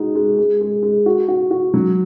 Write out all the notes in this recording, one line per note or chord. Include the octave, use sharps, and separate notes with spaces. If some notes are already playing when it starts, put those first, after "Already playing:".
Already playing: G#3 D#4 F#4
G#3
G#3
G#3
G#3
F#4
F#4
F#4
F#3